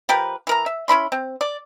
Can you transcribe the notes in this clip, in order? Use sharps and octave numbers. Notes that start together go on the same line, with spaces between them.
F3 G4 A#4 B4
E3 A#4 A#5
E5
C#4 E4 B5 C6
C4
D5